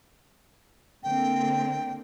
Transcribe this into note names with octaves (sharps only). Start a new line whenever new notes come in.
D3 A#3 C4 G5